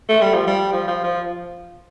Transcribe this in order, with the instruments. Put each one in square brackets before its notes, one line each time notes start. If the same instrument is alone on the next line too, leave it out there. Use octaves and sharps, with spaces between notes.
[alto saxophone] A3
G3
F3
G3
F3
F3
F3